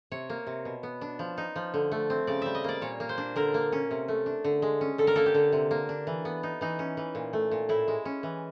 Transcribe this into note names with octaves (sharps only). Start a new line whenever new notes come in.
C3 C#5
A#3
C3
B2
B3
D4
F3
D#4
F3
D3
A3
C4
C#3 D5
G3 E5
D#5
A#3 D5
A#2 C#5
A#3
C5
D4
D3 A#4
A#3
C#4
C3
A3
D4
D3
G#3
C#4
D3 A4
A#4
A#3 A4
G4
D3
C3
A#3
D4
E3
B3
D#4
E3 D#4
C#4
E3
A#2
A3
A#2
A2 E4
G#3
C#4
E3